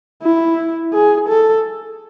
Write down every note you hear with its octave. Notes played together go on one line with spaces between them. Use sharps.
E4
G#4
A4